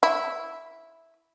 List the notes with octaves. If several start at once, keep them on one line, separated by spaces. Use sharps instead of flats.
E4